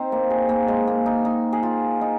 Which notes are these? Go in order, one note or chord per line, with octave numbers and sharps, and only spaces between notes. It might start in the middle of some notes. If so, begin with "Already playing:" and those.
Already playing: C4 D#4
A#3
G#4
A#3
G#3
A#3
D#4
D#4
G#4
F4
D#4